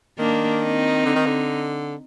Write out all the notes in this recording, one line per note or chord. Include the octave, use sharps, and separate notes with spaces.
D#3 A#3 D4
C4 D#4
D3
D#3
D3